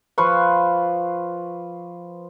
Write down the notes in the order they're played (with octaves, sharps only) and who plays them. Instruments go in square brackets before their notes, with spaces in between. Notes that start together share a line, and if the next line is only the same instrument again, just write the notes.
[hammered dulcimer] F3 F4 B4 C#6